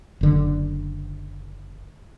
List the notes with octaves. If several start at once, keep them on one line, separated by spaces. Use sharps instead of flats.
F#1 D3